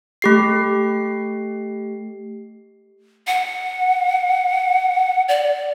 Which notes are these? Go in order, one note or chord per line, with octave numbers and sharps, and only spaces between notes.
A3 G4 C7
F#5
D5